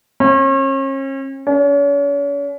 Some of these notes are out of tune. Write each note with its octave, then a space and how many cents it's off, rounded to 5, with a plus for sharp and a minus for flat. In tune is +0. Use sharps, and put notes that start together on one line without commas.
C#4 -40
C#4 +40